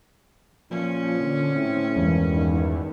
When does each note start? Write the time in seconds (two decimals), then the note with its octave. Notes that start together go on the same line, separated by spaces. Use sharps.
0.71 A#2 F3 C#4
1.21 D3
1.55 A2 C4
1.96 E1 E2 G2
2.35 D#3